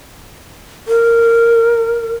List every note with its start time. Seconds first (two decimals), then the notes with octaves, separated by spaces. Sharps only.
0.88 A#4